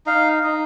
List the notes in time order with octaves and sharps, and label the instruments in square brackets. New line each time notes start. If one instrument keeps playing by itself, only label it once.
[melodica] D#4 F5
D#4